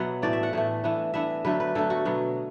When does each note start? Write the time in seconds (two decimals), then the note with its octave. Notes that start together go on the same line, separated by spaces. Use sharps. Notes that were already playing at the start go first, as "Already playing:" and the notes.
Already playing: B2 F#3 B3 E5 F#5
0.22 A2 E3 A3 D5
0.33 E5
0.43 F#5
0.53 A2 E3 A3
0.84 E3 B3 D4
1.14 E3 B3 D4 E5
1.45 D3 F#3 A3 B4
1.60 B4
1.75 D3 F#3 A3 A4
1.90 F#4
2.05 B2 F#3 B3